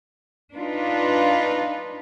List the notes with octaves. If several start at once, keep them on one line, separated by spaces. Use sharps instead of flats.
D4 D#4 F4 B4